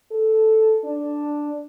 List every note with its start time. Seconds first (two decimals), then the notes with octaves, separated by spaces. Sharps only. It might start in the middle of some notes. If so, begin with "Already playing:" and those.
0.11 A4
0.84 D4